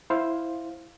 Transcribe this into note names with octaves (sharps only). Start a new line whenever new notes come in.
E4 C5 F5